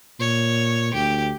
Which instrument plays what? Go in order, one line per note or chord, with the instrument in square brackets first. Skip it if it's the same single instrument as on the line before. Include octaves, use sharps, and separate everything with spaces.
[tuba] A#2 [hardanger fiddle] C#5
[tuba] D2 [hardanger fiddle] G4